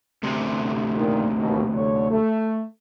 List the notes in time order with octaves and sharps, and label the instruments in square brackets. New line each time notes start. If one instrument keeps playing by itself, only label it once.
[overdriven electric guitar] D2 C3
[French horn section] A#2 D#3
D#2 B2
D3 C#5
A3